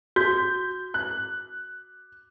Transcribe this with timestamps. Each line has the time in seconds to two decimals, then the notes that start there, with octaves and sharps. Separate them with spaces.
0.16 F#4 G6
0.94 F#6